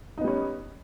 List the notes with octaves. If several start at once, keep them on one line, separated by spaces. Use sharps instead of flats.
G3 B3 C#4 D#4